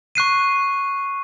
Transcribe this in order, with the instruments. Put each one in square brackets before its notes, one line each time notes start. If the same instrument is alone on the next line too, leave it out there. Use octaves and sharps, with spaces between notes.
[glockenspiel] C#6 F#6 C7 D#7